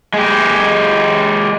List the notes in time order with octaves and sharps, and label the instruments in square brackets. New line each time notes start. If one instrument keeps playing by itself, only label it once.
[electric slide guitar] G#3 G4